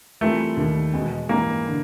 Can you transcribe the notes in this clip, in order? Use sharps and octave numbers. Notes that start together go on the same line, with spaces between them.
E3 G3 A3 C4 F4 A#4
D#2 D#3 G3
E2 B2 G#3
G#2 E3 G3 A#3
D3